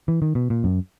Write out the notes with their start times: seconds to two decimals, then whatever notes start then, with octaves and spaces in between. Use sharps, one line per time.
0.08 E3
0.22 D#3
0.35 B2
0.50 A#2
0.64 F#2